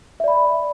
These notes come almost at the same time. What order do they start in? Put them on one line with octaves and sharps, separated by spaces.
E5 D5 B5